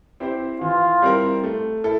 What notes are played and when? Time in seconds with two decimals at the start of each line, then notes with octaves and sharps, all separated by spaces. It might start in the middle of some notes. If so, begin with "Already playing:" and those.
0.20 C4 E4 G4 C5
0.61 E3 F4
1.02 G3 C4 E4 A#4
1.44 A3
1.84 E4 A4